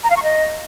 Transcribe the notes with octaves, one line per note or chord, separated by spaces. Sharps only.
A#5
F5
C#6
D#5